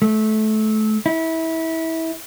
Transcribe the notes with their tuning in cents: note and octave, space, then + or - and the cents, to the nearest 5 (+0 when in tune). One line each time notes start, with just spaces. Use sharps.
A3 -25
E4 -25